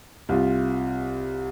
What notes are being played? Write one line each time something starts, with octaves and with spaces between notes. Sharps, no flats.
C2 F4